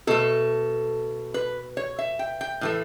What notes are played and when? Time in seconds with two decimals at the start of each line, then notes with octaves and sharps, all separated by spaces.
0.07 B2 A3 A4
1.34 B4
1.77 C#5
1.98 E5
2.19 G5
2.41 G5
2.61 A2 E3 A3